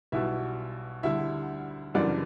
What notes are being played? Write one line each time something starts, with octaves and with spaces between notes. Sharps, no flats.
B1 B2 G3 E4 E5
D2 D3 G3 E4 E5
F#1 F#2 E3 G3 D4 D5